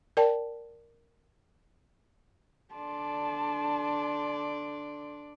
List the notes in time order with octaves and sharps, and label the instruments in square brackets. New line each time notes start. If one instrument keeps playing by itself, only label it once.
[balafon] A#4 D5 G5 A5
[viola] D3 C6 [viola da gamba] D4 D5 [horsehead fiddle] A5